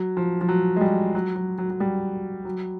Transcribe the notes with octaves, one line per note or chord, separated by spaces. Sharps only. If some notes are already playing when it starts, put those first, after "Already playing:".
Already playing: F#3
F3
F3
F#3
G#3
G3
F#3
F#3
F#3
F#3
G3
F#3